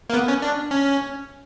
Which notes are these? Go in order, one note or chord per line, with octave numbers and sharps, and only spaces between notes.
A#3
B3
C#4
D4
C#4